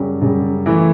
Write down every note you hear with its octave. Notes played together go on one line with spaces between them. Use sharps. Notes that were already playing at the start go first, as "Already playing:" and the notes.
Already playing: F#2 C#3 G3
F#2 C#3 G3
E3 A3 E4